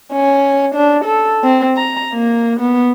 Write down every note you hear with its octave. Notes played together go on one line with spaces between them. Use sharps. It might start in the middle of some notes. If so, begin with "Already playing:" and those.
C#4
D4
A4
C4
A#5
A#3
B3